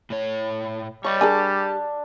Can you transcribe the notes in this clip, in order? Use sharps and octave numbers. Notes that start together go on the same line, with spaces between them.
A2 C#5
G3 C#5 D#5 C#6
D4 G4 G#4 A#4 G#5